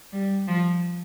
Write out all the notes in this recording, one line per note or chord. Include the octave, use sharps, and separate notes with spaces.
G3
F3